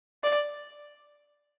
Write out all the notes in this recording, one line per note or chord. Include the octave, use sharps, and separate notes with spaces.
D5